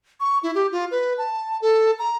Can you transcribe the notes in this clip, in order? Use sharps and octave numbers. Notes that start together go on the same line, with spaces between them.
C#6
E4
G4
F4
B4
A5
A4
A#5